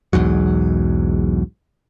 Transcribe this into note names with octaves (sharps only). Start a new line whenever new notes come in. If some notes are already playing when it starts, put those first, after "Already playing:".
B1 E2 G#2 F#3